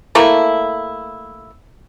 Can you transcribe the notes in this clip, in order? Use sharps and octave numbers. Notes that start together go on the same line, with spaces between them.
A3 A#3 E4